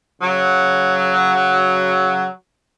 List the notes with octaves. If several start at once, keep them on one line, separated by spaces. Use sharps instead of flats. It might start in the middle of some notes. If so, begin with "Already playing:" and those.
C#3 F#3